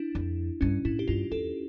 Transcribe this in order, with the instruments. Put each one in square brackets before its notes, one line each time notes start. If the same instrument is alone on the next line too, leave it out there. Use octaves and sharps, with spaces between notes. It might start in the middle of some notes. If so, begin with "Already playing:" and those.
Already playing: [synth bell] D4 E4
[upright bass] F2
[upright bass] G2 [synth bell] C#4
[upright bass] A2 [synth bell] E4
[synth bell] G4
[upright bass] G2 [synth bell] F4
[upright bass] E2 [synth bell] A4